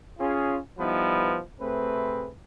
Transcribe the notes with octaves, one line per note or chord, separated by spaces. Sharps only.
C#4 F4 G#4
F3 G3 B3 D#4 E4 B4
C3 A3 C4 G#4 B4